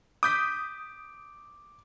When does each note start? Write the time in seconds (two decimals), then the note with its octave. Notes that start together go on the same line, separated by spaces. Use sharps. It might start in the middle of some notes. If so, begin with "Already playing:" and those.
0.23 D6 D#6 G6 B6